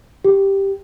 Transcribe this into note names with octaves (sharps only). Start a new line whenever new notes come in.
G4